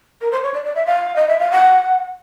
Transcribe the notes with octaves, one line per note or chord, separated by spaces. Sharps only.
A#4
C5
C#5
D5
D5
E5
F5
D#5
E5
F5
F#5